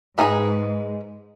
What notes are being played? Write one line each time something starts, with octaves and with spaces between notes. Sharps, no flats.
G#2 G#3 B3 D#4 G#4 B4